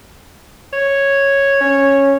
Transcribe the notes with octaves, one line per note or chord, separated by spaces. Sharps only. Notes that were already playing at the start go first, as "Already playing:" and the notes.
C#5
C#4